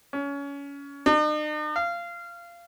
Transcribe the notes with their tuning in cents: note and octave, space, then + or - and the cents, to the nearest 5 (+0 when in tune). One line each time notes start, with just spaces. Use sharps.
C#4 +25
D#4 -45
F5 -20